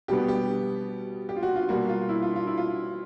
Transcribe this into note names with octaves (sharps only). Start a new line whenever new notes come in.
B2 G3 B3 G4
G4
G4
F4
F#4
F4
B2 G3 A#3 F#4
F4
E4
F4
F4
E4
F4